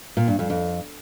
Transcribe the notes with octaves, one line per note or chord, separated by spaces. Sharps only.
A#2
G2
F2
F2